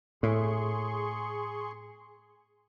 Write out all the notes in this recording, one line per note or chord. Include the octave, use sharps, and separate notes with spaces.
A2 G#4 C6 C#6